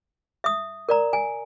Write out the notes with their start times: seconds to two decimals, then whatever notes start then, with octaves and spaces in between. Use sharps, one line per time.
0.44 E5 D#6
0.89 A#4 D5 A#5
1.13 G#5